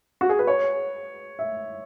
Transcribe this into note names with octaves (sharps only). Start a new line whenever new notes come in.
F#4
G#4
B4
C#5
E5